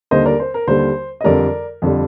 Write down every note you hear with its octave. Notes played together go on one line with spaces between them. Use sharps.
D#2 D3 G3 C5 D#5
A#4 D5
C5
A#4
D#2 D3 G3 C5
D#5
F2 D3 G3 A#4 D5
F2 D3 G3